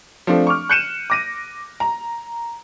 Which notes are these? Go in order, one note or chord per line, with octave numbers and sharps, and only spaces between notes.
F3 A3 C4 D4
C#6 D6 F6
F#6 G6 C#7 D#7 E7
D6 A#6 D#7
A#5